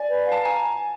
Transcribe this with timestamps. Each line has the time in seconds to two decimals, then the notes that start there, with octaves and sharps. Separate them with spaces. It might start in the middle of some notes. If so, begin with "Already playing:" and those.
Already playing: D5 G#5
0.09 B4
0.25 F5
0.32 A5
0.41 G#5 A#5